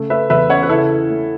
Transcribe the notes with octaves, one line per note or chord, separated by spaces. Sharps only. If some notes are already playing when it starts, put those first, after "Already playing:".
Already playing: C#3 A3
A3 B4 E5
E2 B4 E5
C#4 C#5 F#5
B4
C#3 E4 A4
E4
A3